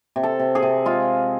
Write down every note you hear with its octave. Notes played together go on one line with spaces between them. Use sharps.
C3
A4
C3
G#4
C3
G#3 F4